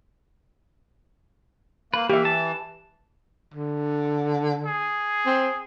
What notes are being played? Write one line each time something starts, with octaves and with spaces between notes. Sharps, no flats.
A#3 B4
E3 A#3 G4 E5
A5
D3
G#4
C4